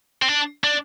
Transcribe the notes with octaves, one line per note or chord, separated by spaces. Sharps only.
C4
D4
D4